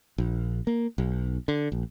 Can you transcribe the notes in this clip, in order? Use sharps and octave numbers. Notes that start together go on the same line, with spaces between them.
A#1
A#3
B1
D3
A#1